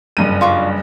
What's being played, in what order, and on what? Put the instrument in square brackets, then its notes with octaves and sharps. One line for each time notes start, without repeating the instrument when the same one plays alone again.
[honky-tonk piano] F#1 G2 D#7
[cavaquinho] F4 C#6 D6